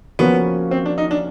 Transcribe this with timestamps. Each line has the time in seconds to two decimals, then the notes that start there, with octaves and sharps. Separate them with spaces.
0.19 C#3 F3 A#3 B3 C#4 F#4
0.71 C4
0.86 D4
0.98 D#4
1.11 D4